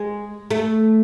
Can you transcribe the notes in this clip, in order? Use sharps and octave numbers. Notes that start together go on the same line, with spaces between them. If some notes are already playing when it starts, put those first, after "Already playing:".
Already playing: G#3
A3